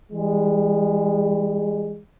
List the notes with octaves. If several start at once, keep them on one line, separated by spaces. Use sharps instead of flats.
E3 G3 G#3